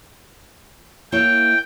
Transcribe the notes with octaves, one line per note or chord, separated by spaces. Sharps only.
A#3 E4 C#5 G5